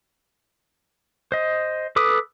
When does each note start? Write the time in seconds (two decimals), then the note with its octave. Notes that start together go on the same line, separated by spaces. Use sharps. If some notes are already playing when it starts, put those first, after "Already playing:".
1.32 C5 D#5
1.96 A4 B4 D6 D#6